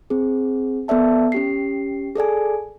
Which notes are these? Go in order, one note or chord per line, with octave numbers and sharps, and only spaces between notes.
C4 G#4
B3 A4 D5 E5 A5
C#4 G4 C7
G#4 A4 D5 G#5